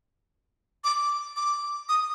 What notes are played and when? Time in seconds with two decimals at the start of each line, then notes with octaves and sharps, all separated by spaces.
0.84 D6
1.36 D6
1.89 D#6